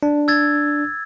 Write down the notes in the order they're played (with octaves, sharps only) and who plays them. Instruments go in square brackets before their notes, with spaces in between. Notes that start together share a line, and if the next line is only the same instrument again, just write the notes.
[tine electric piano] D4
[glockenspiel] E6 G#6 A6